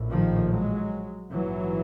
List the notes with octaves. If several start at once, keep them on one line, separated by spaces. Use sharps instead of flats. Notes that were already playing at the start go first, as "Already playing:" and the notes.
Already playing: A#1 A2
D#3 F3
F#3 G#3
A#1 G#2 E3 F#3